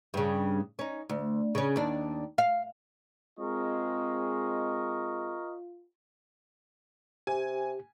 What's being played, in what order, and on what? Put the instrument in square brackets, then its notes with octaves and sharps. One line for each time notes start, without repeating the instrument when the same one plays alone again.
[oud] G2 C#3
C#4 D#4
D2
C#3 C#4
D#2 D4
F5
[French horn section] G#3 C4 [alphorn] F4 [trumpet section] A#4 D#5 C#6
[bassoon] C3 [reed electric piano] G4 [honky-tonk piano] G#5